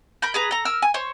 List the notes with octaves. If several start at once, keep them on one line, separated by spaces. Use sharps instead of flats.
A#4 B5 G6
G#4 B4 A#5
A4 A#5
A#4 E6 F6
G#5
C5 C#5